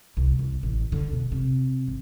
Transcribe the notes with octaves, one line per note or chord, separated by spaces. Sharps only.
C2
C2
A1
D3
B2
C3
G#1